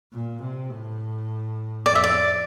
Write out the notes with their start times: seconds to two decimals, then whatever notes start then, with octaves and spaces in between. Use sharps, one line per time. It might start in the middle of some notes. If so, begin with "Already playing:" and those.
0.13 A#2
0.41 C3
0.70 A2
1.86 F2 D5
1.95 E5
2.04 D5